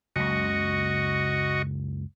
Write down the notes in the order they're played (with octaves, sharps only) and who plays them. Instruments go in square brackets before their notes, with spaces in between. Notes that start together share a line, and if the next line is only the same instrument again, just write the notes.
[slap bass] F#1 C#2 [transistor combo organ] F#4 D#5 C#6